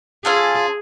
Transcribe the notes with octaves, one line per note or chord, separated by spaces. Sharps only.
C#4 F4 G#4 A4